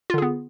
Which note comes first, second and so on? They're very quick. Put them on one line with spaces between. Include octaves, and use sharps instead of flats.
F4 D3 G#4 B3